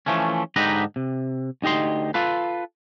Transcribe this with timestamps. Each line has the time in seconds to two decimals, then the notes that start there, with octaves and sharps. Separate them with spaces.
0.06 E3 F3 A3 C#4
0.56 G#2 D3 D#4 G4 B4 A#5
0.96 C3
1.62 D2 D#4 G4 D#5 C6
2.14 F4 A4 B4